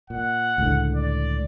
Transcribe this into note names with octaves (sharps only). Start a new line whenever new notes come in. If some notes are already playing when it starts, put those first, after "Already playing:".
A#2 F#5
C#2 A2 D3
D5